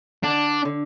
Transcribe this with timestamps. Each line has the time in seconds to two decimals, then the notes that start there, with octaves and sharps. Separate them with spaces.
0.23 D3 D4
0.65 D3